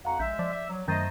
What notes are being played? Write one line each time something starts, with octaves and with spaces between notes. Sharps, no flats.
F2 F#4 F5 F#5 A#5
A#1 G#3 E5 G6
F3 D5
E5
F#3
F#2 D#3 A3 C5 D#5 A#5 G6 A6